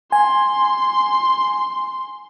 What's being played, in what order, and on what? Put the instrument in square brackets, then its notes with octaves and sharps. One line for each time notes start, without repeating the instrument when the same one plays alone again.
[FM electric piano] G#5 [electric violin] C6